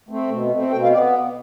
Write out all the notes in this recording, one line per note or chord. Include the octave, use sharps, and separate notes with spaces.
A3 C4
B2
A3 C4
B2 G5
F5
B3 D5